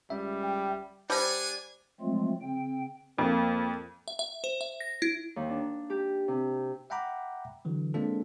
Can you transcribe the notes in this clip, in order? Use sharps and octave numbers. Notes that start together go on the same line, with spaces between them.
C#2 G3 E5
G5
G3 D4 C5 F#5 G#5 A5
F3 F#3 G#3 A3 C4 F4
C#3 C4 G5
F2 A#3
E5
E5
C5
E5
A#6
E4
D#2
D4
G4
C3
E5 F#5 G5 A#5 B5 D6
D3 E3 F#3
G#3 A#3 C4 D4 F4 A4